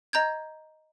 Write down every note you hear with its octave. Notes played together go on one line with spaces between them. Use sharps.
D#5 A#5 G6 G#6